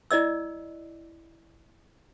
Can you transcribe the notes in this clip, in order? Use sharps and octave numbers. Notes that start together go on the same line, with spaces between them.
E4 D5 D#5 E6